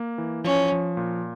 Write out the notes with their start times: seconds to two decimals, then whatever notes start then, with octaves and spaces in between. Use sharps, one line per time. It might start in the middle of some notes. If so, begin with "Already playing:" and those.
Already playing: A#3
0.18 E3
0.44 F3 C#4
0.72 F3
0.97 A#2